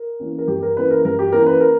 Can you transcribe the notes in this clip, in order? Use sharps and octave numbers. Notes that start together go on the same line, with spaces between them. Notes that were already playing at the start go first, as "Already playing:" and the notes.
Already playing: A#4
E3 A#3 C#4
A#4
G2 G4
A#4
E3 A#3 C#4 B4
A#4
G2 A#4
G4
E3 A#3 C#4 A#4
B4
A#4